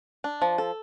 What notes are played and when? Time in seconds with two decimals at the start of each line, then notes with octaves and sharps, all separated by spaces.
0.24 D4
0.42 F3
0.58 A4